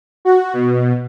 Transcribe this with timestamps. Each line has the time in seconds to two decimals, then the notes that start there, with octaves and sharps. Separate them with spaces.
0.25 F#4
0.53 B2